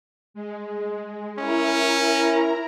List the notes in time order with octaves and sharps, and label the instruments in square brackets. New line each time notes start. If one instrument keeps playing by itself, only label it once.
[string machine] G#3
[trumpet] C#4 [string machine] E4 A#4 A#5